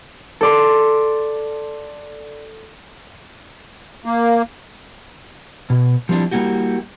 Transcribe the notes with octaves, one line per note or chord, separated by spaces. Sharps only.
A4 D5 C6
A#3
B2
F3 G3 C4 D4 E4
G3 A#3 E4 F#4 G4